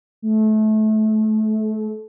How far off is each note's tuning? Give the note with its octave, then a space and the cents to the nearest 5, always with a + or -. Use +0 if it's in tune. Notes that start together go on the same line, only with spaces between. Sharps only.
A3 -25